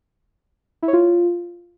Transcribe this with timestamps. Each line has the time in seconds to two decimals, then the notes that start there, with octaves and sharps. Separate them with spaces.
0.82 E4
0.88 C#5
0.93 F4